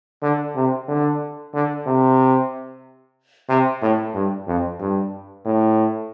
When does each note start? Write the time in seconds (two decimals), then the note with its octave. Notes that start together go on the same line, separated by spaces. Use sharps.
0.23 D3
0.56 C3
0.88 D3
1.54 D3
1.87 C3
3.49 C3
3.82 A2
4.15 G2
4.47 F2
4.80 G2
5.45 A2